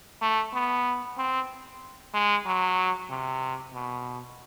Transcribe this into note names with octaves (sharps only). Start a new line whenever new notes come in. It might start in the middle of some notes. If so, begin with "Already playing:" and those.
A3
B3
C4
G#3
F#3
C3
B2